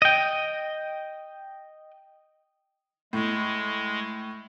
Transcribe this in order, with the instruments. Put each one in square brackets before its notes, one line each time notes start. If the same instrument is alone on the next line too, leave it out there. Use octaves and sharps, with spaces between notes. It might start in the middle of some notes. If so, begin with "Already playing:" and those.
[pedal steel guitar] D#5 G5
[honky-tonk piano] A2 [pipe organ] G#3